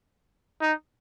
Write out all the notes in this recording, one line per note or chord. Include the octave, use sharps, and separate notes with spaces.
D#4